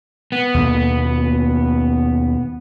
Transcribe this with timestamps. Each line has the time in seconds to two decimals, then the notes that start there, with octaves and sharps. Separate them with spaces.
0.32 B3
0.54 D#2 B2 A#3